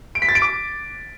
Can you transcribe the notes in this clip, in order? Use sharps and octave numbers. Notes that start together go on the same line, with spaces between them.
D7
B6
A6
D7
D6